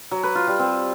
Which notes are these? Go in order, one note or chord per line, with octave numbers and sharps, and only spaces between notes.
F#3
B4
F4
G3
C4